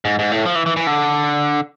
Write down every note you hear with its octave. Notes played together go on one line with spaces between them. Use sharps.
G#2
G#2
A2
F3
E3
E3
E3
D3